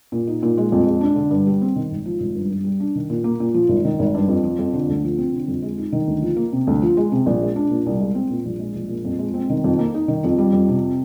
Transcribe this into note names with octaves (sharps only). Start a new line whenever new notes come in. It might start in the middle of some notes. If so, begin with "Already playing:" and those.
A#2
D#4
A#2
G#3
F2
G#3
D4
D3
G2
G3
C4
D#3
G#1
F3
G#1
G2
G2
G3
D4
D#3
A#2
A#3
A#2
F3
G#1
D#3
G#1
G2
F2
F3
F2
D3
D2
F3
C4
D3
F2
G#3
D#4
D#3
D2
F3
A#3
C3
D2
F3
G#3
C3
A#1
G#3
D4
A#2
C2
G#3
C4
A#2
A#1
G#3
A#1
A#2
F2
G#3
C4
D#3
F2
A#3
D#4
D#3
F2
G3
F2
C3